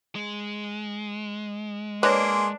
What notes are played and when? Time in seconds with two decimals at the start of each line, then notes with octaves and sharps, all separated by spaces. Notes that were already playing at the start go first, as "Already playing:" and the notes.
0.15 G#3
2.03 A#3 D4 G#4 B4 C#5 D#5 C6